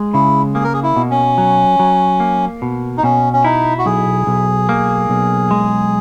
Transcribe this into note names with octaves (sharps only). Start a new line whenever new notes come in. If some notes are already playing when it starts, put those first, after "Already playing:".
Already playing: G#3
C#3 E4
A#3 G#4
A#4
G#4
E4
B2
C#4
F#3
F#3
A#3
B2
D#4
B2 C#4
C#4
D#4 E4
F#4
B1 G#4
B1
A#3
B1
G#3